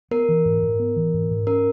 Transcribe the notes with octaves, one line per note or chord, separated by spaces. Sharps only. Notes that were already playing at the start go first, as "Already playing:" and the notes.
B3 A#4
E3
G#2
G#2
B3
E3
G#2
G#2
C#4 A#4